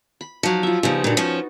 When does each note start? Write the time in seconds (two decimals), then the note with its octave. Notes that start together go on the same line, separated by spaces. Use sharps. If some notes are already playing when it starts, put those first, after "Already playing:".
0.21 B5
0.43 F3 F#3 D#4
0.63 F4 E5
0.83 C#3 F3 G3 B3 D#4
1.04 A#2 D3 D#4 F#4
1.17 F3 C#4